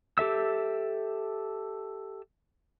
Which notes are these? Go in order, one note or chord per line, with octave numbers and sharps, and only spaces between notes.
G4 A4 E5 E6